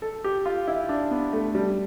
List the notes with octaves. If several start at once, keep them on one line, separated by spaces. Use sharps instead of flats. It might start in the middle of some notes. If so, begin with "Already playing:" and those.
A4
G4
F4
E4
D4
B3
A3
G3